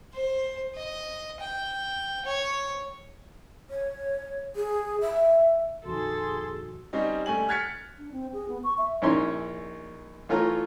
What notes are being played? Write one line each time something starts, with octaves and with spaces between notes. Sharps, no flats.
C5
D#5
G5
C#5
C#5
G#4
E5
A#1 F2 D#3 F#4 G#4 A4 C6
G3 C4 C#4 D#4
G3 A3 C#4 G#5 F#7
F6 F#6 G#6 A6 B6 C#7
D4
C4
G#4
B3
C#6
E5
A#1 C#4 D#4 E4 C#5 C6
E3 A3 F4 C#5 A#5